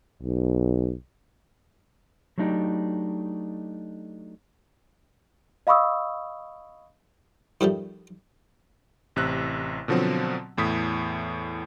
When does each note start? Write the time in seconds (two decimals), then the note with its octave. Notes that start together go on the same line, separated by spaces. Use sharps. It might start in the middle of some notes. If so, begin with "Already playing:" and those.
0.22 B1
2.38 F#3 A3 D4 D#4 G4
5.67 D#5 F5 B5 C#6 D#6 E6
7.61 D#3 F3 G3 A3
9.16 A1 C3 E6 F#6
9.88 B2 D3 F3 F#3 C4
10.57 E2 A2 D#6 B6